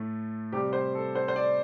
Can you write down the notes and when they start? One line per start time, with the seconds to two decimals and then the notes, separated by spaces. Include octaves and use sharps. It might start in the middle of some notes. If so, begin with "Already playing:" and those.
Already playing: A2 A3
0.52 C3 G3 G4
0.73 C5
0.95 A4
1.15 C5
1.28 C5
1.36 D5